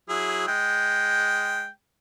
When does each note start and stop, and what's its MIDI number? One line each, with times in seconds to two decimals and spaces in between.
0.09 0.46 54
0.09 0.46 64
0.09 0.46 68
0.48 1.68 56
0.48 1.68 79